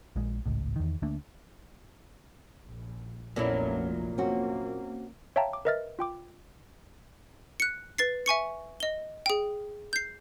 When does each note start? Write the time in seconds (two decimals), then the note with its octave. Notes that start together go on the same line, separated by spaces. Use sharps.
0.16 A#1 A#2 G#3
0.46 G#1 C#2 A2
0.76 E2 D#3
1.02 D2 A3 A#3 D4
2.64 A#1
3.36 F1 A#1 A#2 F#3 B3 C#4 E4 A4
4.18 A#3 C4 C#4 F#4
5.36 C#5 E5 F5 G5 A5 A#5
5.53 D6
5.65 A#4 B4 D#5 E5 F6 A6
5.99 F4 G5 D6
7.60 F#6 C#7
7.98 B4 A6 C7
8.26 E5 G#5 C#6 C#7
8.80 D#5 G7
9.26 G#4 G5
9.93 G6 C7